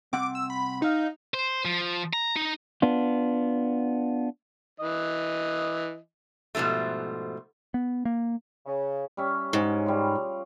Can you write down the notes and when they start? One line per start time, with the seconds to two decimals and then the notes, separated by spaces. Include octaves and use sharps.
0.13 C2 C4 F#5 D6
0.35 E6
0.50 B5
0.82 D#4 D#5 F5
1.34 C5
1.65 F3
2.13 A#5
2.36 D#4
2.82 B3 D4 F4
4.80 E3 D#5
6.55 G#2 B2 F3 G3 A3
7.74 B3
8.05 A#3
8.66 C#3
9.17 G3 C#4 E5
9.53 G#2 G#4 C#5 G#5
9.86 G3 F4